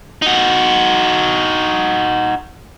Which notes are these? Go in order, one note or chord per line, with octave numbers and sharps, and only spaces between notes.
D#4 F#4